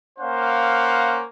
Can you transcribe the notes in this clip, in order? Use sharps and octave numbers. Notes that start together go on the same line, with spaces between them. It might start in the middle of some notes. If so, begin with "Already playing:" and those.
A#3 C#4 C5 F5 F#5